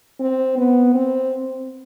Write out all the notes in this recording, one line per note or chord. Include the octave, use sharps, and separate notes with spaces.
C4
B3
C4